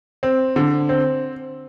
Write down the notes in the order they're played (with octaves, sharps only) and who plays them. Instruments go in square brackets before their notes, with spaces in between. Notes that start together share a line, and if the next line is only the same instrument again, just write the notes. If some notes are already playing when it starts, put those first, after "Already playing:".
[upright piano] C4
D3
C4